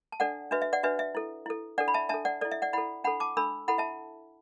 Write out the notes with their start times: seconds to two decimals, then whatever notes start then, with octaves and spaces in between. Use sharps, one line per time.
0.12 A5
0.20 D4 A4 D5 F#5
0.51 D4 F#4 B4 E5
0.62 E5
0.73 D5 F#5
0.83 D4 F#4 B4 E5
0.99 E5
1.15 E4 A4
1.46 E4 A4
1.78 D4 A4 D5 F#5
1.88 B5
1.94 E5 A5
2.09 D4 A4 E5 A5
2.25 D5 F#5
2.41 E4 A4 D5
2.51 E5
2.62 D5 F#5
2.73 E4 A4 F#5 B5
3.04 D4 A4 F#5 B5
3.20 A5 D6
3.37 D4 A4 B5 E6
3.68 E4 A4 F#5 B5
3.78 E5 A5